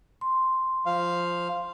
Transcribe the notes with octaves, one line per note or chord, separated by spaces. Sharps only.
C6
F3 F5